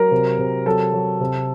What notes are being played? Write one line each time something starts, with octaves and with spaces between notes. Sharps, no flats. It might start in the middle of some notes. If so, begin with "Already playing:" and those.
Already playing: F#3 A#4
C3
C3
F#3 A4
F#3
C3